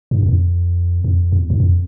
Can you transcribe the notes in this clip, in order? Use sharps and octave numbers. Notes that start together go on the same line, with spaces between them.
G2
E2
F2
F2
E2
G2
F2